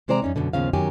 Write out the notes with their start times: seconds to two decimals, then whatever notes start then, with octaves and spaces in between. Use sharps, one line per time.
0.08 C3 G#3 C4 C5 D5 A#5
0.22 F#2 C#4 D#4
0.36 F#2 B2 D3
0.53 D#2 G#2 C#3 F3 F5
0.73 F#2 D#3 F#3 G4 G#5